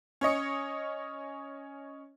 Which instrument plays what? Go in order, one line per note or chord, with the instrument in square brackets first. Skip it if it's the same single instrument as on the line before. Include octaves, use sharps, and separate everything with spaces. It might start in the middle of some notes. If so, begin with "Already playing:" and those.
[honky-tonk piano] C#4 C#5 D#5 C#7